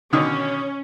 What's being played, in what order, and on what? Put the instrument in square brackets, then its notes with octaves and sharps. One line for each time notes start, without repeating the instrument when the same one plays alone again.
[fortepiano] B2 D3 D#3 [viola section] C#4